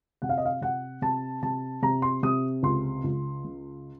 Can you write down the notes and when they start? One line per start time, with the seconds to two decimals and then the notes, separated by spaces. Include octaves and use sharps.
0.22 C3 F#5
0.29 F5
0.37 D#5
0.45 F5
0.61 C3 F#5
1.02 C3 A5
1.42 C3 A5
1.82 C3 A#5
2.02 C6
2.23 C3 D#6
2.63 C#2 C6
3.04 C#2
3.44 C#3